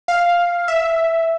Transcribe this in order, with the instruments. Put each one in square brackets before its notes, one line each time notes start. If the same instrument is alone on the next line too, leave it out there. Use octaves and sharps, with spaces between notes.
[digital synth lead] F5
E5